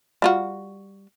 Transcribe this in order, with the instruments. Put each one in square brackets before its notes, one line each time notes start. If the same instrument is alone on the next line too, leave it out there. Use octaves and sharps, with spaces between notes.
[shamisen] G3 F4 F#4